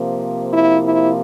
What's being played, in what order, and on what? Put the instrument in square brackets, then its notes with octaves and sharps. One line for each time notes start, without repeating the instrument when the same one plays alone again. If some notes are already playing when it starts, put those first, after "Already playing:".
Already playing: [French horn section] C3 F3 A#3
E4
E4